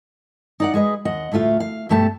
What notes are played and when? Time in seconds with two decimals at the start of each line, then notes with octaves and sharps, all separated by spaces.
0.60 D#4 D5 F#5
0.74 G#3 G#4 B4 D#5
1.05 D#2 D#5 F#5
1.32 D2 A2 A3 F4 F5
1.60 F5
1.89 G2 B2 A3 G4 B4 A5